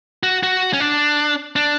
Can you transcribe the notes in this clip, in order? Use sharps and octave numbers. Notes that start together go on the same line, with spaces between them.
F#4
F#4
C#4
D4
D4